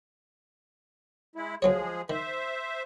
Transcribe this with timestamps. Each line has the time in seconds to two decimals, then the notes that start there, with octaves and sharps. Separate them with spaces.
1.36 G#3 E4
1.62 D2 F3 F#3 G#3 G#4 C#5
2.10 D#3 C5 E5